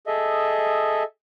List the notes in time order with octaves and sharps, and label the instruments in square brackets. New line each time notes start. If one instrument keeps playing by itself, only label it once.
[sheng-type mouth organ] G#4 A4 D#5 E5